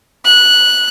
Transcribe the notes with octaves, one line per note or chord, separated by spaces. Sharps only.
F#6